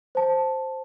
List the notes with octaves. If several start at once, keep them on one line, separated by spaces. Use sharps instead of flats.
C5 A5